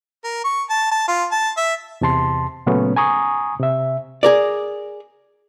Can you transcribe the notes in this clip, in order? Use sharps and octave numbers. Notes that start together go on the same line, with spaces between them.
A#4
C#6
A5
A5
F4
A5
E5
E2 C3 A5 C6
A#2 C#3 F#3 A3 B3 C#4
G#5 A#5 C#6 D#6
C3 E5
G#4 A#4 D5